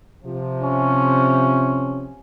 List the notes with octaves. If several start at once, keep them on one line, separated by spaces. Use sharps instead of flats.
C3 F3
C#4